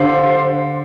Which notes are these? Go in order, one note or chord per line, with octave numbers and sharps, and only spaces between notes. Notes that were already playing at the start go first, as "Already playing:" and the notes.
Already playing: D3 D4 G4 C5 F5 C6